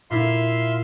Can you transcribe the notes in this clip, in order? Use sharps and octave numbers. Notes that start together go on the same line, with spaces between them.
A#2 E4 E5 F5 C6